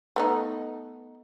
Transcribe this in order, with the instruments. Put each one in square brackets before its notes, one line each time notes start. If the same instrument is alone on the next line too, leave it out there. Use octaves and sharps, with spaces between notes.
[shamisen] A3 B3 D#4